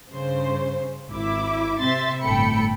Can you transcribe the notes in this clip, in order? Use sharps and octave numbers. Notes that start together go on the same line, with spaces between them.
G2 C#3 C5
G#1 E4 E5 D6
C3 C4 E5 C6 A6
G1 A2 A4 G5 B5 C#7